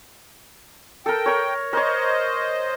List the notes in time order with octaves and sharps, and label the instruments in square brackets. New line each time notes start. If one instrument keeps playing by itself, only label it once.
[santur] A4 A#4 [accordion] G5
[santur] A#4 C#5
[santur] A#4 C#5 [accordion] C5 D#5